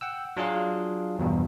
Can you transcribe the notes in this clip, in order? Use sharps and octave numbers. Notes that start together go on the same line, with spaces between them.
F#5 G5 E6
F#3 D4 F4 G#4 F5
E2 G2 B2